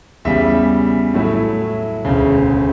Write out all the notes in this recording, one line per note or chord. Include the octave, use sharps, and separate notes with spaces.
E2 C#3 G3 E5
A2 F#3 A3 E4
E1 D2 C#3